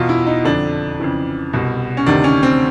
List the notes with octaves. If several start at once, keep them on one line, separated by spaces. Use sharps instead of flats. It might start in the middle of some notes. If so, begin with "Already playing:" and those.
Already playing: E2 B2 F4
E4
D#4
F2 D3 D4
F2 C#3 E3
C2 B2
C#4
D2 C3 D#3 D4
C#4
C4